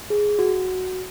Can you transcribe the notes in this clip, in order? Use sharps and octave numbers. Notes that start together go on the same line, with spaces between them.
G#4
F#4